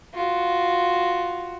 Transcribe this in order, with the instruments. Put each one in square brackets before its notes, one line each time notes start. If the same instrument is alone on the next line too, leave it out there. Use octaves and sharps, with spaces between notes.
[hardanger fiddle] F4 F#4